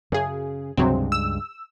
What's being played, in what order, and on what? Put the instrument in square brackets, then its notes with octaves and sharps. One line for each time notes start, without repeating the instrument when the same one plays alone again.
[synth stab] F#2 G#4 [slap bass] C#3
[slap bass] C#2 G2 G#3 [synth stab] C3 F#3 C4
[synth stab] E6